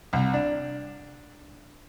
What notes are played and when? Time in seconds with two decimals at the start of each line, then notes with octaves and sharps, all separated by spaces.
0.13 C2
0.34 D4